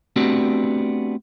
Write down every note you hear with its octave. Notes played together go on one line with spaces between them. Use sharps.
A3 B3 C4 D4 F#4 G4